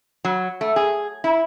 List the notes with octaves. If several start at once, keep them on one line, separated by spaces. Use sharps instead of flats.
F#3
A3
G#4
E4